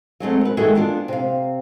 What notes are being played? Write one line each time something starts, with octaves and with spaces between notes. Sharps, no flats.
F#3 G#3 A3 C4
A#4 B4
D#3 E3 G#3 F#4 G#4 A4
B3 D4 F4
C3 F5